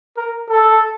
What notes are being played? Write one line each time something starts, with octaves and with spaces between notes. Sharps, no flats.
A#4
A4